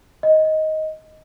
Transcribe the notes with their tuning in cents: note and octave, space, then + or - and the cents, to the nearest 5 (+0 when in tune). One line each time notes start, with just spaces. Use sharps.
D#5 +10